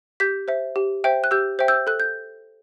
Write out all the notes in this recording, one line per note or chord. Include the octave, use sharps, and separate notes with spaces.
G4 G6 B6
C5 E5
G4
C5 E5 G5
F#6
G4 E6 G6
C5 E5 G5
E6 G6
A4 F#6
G6